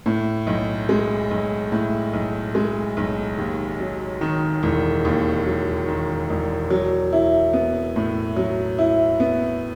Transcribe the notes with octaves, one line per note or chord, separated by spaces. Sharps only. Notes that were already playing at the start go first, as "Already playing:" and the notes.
A2
B1
G#3
B1
A2
B1
G#3
B1
D#2
F#3
D#3
E1
D#2
F#3
D#3
E1
F#3
E4
B3
A2
F#3
E4
B3